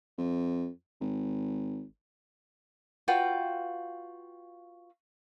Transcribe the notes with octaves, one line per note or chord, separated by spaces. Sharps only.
F2
G#1
F4 F#4 B4 G5